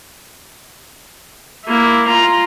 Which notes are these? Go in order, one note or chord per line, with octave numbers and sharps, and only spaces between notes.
A#3 E4
F4 A#5